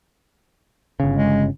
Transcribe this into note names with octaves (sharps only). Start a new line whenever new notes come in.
G1 C#3
G#3